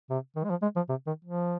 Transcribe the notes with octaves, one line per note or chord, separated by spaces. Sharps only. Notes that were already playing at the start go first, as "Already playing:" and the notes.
C3
D#3
G#3
F3
G#3
F3
C3
D#3
F3